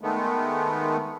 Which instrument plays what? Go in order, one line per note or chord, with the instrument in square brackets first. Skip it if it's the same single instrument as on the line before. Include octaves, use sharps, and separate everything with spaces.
[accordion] D#3 G#3 A3 B3